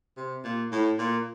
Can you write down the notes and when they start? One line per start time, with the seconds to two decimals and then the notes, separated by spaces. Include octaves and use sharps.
0.17 C3
0.44 A#2
0.72 A2
0.98 A#2